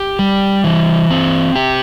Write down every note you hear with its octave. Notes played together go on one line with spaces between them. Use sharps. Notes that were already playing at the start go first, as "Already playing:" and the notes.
Already playing: G4
G3
E3
C4
G4